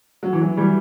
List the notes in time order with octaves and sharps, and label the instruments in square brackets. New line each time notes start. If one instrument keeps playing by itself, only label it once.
[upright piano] F#3
E3
F#3
E3 G3